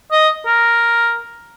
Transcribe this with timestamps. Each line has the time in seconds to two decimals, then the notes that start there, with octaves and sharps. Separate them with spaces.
0.11 D#5
0.46 A#4